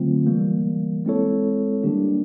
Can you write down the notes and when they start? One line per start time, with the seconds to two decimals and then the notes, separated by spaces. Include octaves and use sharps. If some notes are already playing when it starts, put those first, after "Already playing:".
Already playing: D3 F#3 A3 C4 F4
0.27 E3 G3 A#3
1.05 G#3 C4 E4 A4 C#5
1.83 D#3 G3 A#3 D4 G4